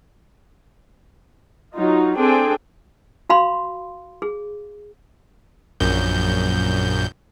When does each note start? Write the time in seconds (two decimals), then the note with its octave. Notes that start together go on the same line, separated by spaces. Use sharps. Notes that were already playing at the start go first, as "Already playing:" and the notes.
1.74 F#3 D#4 F4
2.17 C4 D4 G#4 A4 G5 G#5
3.30 F#4 F5 B5 C6
4.22 G#4
5.80 A#1 F#2 G6